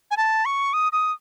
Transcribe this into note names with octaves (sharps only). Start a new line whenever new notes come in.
G#5
A5
C#6
D#6
D#6